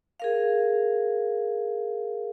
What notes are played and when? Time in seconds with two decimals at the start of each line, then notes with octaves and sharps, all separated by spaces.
0.20 G#4 A#4 F5